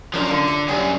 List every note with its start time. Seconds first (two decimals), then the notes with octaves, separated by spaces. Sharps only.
0.14 F#2 F3 D4 D#4 A#4
0.28 D3 D4 F4
0.47 E5 A#5 C6
0.68 F#2 F#3 G3 G#4